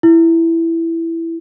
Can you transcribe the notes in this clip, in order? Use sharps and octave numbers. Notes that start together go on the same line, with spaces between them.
E4